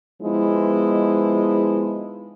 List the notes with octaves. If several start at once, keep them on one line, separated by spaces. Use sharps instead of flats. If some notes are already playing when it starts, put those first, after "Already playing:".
F3 G#3 B3 D#4 E4